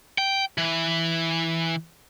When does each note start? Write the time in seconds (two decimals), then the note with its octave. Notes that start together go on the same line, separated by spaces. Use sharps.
0.18 G5
0.58 E3